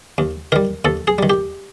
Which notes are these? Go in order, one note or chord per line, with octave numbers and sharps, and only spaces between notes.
D#2
D#3 G3 A#4
D#2 A4
G#4
D#3 G3
G4